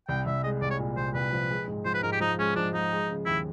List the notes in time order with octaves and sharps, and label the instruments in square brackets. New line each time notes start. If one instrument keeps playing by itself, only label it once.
[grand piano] C2 [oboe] G5
[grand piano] C2 [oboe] E5
[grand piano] G#3 [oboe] D#5
[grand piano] C2 [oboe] D5
[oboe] C#5
[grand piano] A#2
[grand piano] C2 [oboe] C5
[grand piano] C2 [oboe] B4
[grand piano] F3
G#3
G#2
[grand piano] F3 [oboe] C5
[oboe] B4
[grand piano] G#2 [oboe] A#4
[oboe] G4
[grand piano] F3 [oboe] D#4
[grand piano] G#3 [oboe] C#4
[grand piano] F3 [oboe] D4
[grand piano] F3 [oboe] D#4
[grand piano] G#3
C#3
[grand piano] D#2 [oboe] E4